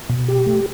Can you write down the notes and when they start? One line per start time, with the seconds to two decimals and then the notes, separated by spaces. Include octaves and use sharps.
0.10 B2
0.28 G4
0.46 A3